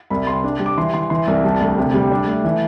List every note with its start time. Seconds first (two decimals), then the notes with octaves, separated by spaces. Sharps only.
0.10 C2 B5
0.27 C3 C6
0.44 D4
0.60 G3
0.66 D6
0.78 E3 C6
0.94 E3 C6
1.10 E3 C6
1.27 C2
1.44 G3 A5
1.61 D2
1.78 C3
1.94 G3
2.11 D4
2.27 A3
2.44 E3